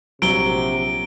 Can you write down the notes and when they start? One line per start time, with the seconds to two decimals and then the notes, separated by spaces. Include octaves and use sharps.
0.22 A#1 C3 F#3 D7 G7